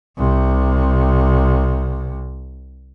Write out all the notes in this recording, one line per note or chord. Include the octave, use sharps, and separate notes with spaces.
C2 C3